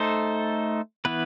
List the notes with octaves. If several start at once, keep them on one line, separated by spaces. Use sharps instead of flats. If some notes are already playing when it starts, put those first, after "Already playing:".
Already playing: A3 D#4 A4 C5
E3 B3 E4 B4